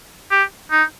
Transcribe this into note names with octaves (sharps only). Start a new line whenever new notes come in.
G4
D#4